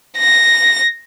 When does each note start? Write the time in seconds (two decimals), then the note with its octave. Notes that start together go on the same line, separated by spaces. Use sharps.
0.18 A#6